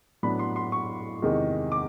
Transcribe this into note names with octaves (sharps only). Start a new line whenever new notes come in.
A2 F#3 B3 D4 B5
C6
C6
C#6
E2 C3 D#3 G#3
D6